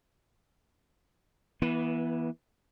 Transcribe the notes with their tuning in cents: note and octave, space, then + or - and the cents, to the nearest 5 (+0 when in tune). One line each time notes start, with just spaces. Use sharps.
E3 +0 B3 -25